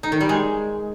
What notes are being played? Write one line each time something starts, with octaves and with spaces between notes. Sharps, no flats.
D#4
D#3
G3
G#3